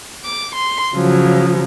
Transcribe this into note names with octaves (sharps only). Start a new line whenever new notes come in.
D6
C6
C#3 F3 F#3